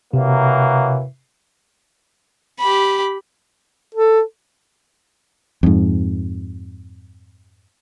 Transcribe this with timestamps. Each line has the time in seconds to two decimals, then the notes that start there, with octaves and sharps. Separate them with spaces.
0.13 C3 E3 F#3 A#3
2.59 G4 B5
3.95 A4
5.63 F2 G#2